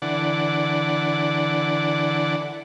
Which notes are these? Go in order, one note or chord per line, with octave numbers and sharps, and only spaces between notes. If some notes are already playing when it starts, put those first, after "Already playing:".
D3 E3 D5 F#5